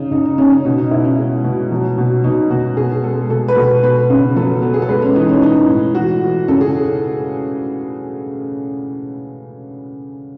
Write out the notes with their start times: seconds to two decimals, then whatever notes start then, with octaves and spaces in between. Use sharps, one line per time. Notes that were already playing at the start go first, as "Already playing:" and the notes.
Already playing: C#3 D#4
0.11 C#3 D#4
0.25 D#4
0.38 C#3 C#4
0.52 C#4
0.65 B2 D#4
0.78 D#4
0.91 B3 E4
1.05 C#4
1.18 G#3
1.44 B2
1.71 F#3
1.98 B2
2.24 B2 D#4
2.50 B2 F#4
2.77 B3 G#4
3.03 G#3 A4
3.29 B2 A4
3.48 B4
3.56 B2 A4
3.83 B3 B4
4.10 C#3
4.36 F#3 A4
4.62 B3
4.74 G#4
4.82 A4
4.89 G#3 B4
5.02 C#4
5.16 E3 D#4
5.29 C#4
5.42 E3 D#4
5.69 A2
5.95 E3 F#4
6.22 E3
6.48 C#3 A4
6.61 G#4